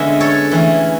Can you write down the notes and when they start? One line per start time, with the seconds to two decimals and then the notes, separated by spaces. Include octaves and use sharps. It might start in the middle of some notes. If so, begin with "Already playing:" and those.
Already playing: D3 G#3 B3 C#4 E5
0.20 A4 C#5
0.51 E3 A3 C#4